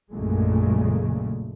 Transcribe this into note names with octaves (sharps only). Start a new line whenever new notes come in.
A#1 F#2 A#2 C#3 G#3 A3